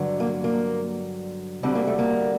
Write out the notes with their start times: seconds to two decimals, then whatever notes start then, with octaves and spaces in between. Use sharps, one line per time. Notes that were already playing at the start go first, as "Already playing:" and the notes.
Already playing: G2 D3 F#3
0.20 A#3
0.44 A#3
1.63 D2 D3 G3 C4
1.75 A#3
1.87 A3
1.99 A#3